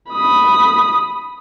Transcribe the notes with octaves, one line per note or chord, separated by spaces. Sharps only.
B5 D#6